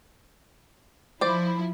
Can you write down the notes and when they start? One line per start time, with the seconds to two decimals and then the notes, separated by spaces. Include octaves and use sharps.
1.21 F3 E4 C5 D5